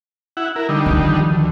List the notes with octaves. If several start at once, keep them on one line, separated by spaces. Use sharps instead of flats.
E4 F#5
E4 A#4
D3 G3 D#4
D#3 F3
D2